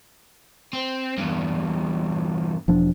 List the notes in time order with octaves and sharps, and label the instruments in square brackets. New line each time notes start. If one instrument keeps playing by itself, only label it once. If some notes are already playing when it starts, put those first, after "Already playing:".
[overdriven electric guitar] C4
E2 G2
[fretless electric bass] E1 F3 D4